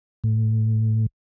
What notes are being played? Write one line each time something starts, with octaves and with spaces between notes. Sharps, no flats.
A2